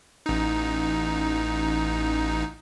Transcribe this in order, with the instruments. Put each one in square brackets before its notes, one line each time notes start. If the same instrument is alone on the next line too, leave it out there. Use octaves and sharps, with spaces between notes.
[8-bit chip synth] A1 D#4